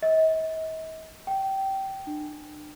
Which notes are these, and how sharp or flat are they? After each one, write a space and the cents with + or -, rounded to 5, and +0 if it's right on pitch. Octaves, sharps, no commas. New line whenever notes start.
D#5 +45
G5 -15
D4 +35